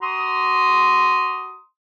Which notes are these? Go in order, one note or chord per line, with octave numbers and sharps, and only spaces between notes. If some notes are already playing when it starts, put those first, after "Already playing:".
F#4 A#5 C6 D#6